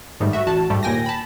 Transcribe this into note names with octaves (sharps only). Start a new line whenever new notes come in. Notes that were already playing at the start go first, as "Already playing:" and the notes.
G#2 D#3 G3 A3
F#4 E5
A1 F#4 A5
G#2 G3 A3
D#2 A#2 G5 G#5 A#6
A5 B5